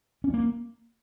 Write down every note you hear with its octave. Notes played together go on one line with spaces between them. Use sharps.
C#4
A#3